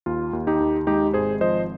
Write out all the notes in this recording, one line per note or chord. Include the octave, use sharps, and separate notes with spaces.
D#2 F4
D#2
D#4 G4
D#2
G#3 D#4 G4
G#1 G#4 C5
F3 C5 D#5